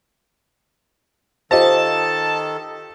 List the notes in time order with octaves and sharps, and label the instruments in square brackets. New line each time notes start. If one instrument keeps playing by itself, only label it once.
[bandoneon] D#3 A4 [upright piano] F4 G4 D#5 [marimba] C5 [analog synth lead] A5